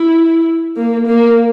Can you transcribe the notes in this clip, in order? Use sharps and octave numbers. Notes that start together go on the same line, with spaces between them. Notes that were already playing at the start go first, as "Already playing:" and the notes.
Already playing: E4
A#3
A#3